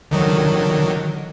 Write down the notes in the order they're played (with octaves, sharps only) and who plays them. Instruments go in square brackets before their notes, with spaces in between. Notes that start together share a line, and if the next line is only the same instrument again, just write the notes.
[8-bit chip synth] D3 D#3 F#3